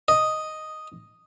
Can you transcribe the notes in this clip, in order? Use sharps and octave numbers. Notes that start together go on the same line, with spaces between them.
D#5